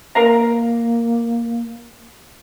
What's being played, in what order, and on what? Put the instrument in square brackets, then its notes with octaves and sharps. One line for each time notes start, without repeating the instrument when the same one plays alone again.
[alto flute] A#3 [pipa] A#4 F5 A#5